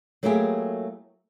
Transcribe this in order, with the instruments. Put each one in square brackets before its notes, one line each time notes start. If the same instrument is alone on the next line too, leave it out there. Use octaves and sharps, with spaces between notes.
[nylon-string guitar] F#3 A3 A#3 E4 G4 G#4